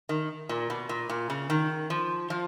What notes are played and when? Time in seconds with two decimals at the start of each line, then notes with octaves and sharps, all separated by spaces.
0.09 D#3
0.49 A#2
0.70 B2
0.89 A#2
1.09 A#2
1.30 C#3
1.50 D#3
1.90 F3
2.30 F3